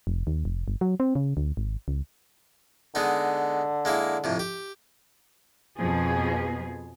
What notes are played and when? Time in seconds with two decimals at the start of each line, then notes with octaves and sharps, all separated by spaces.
0.07 F1
0.27 D#2
0.45 F1
0.68 G1
0.81 F#3
1.00 C4
1.15 C#3
1.37 D2
1.57 G#1
1.88 C#2
2.95 D3 G#3 B3 D#4
3.85 G#3 A#3 E4
4.24 F2 A2 C3
4.39 G4
5.77 F2 B2 F3 B3 G#4